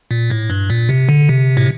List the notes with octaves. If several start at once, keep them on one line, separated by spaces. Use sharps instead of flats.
A#2
A2
G2
A#2
C3
D3
C3
A2